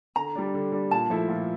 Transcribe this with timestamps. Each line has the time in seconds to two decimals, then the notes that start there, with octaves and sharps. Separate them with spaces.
0.16 D3 A#5
0.35 G3 D4
0.54 D3
0.72 G3 D4
0.91 A#2 A5
1.10 F3 A3 E4 A4
1.29 A#2